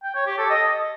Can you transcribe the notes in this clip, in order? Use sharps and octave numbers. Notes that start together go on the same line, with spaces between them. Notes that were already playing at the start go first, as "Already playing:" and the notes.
G5
C#5
G4
A4
D#5